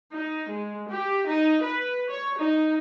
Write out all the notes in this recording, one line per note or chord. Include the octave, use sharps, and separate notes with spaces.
D#4
G#3
G4
D#4
B4
C#5
D#4